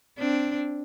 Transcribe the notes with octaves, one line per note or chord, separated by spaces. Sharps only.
C4 D4